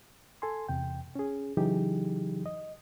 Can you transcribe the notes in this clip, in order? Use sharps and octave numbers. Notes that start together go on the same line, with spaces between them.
A4 G#5 C6
E2 C3 G5
C#4 G#4
C#3 E3 F#3 D#4 G4 G#4
D#5